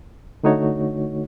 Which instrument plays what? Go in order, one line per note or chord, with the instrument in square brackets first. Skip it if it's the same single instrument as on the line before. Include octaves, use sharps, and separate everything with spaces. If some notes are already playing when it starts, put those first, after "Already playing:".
[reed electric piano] D3 A3 D#4 F#4 C#5